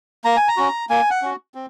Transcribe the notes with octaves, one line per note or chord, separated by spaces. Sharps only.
A#3 A#5
G#5
A#5
C#4 F#4
A#3 G#5
F#5
C#4 F#4
C4